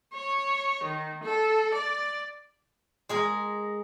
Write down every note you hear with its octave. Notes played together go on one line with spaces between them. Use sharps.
C#5
D#3
A4
D5
G#3 G#4 A#4